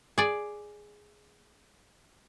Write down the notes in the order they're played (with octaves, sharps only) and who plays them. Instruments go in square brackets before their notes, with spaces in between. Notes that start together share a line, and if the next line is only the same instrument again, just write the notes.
[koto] G#4 D5